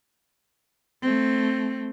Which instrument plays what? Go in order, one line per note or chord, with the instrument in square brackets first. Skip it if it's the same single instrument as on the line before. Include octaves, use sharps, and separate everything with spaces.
[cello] A3 C4